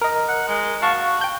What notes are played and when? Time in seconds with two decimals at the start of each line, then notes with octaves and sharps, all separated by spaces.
0.02 A#4 D#5
0.29 F#5
0.48 G#3
0.82 F#4 F5 A5 C#6
1.21 G5 G6